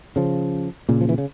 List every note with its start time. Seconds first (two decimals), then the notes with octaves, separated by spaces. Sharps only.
0.16 C#3 F3
0.89 A#2 C#3
1.01 F3
1.09 E3
1.18 C#3